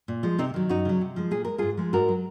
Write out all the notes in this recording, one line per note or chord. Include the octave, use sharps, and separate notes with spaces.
A#2
F3 G#3
C3 C4 D#4
D#3 F#3
F#2 D#4 F#4
C#3 F#3
C3
F3 G#3
A#2 G#4
G#3 A#4
G#2 F4 G#4
F3 G#3
G#2 F#4 A#4
F#3